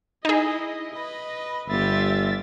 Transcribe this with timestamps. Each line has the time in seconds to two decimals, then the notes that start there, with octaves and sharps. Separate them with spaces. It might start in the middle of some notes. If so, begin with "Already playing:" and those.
0.25 D#4 E4 G#4 D#5
0.93 B4 D#5
1.68 G1 B3 F4 G4 E5 A6